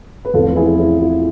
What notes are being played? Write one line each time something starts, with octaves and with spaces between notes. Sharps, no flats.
B4
E2 C3 F3 A3 C4 F4 A4
E4 G#4
E4
F4